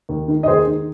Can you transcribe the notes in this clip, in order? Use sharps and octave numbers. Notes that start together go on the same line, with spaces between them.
D#2
D#3
D#5
D#2 G#4 C5
D#3